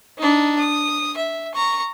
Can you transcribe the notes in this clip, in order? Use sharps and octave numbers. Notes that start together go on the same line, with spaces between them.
D4 D#4
D#6
E5
A#5 C#6